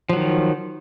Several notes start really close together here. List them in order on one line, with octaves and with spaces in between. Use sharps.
F3 F#3 D#3